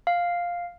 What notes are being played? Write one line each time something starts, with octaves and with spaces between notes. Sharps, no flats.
F5